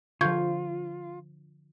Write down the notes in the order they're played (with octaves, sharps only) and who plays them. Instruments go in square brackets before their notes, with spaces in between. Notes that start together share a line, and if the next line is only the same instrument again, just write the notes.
[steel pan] D3 F3 [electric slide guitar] F4 [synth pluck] C#6 G6 G#6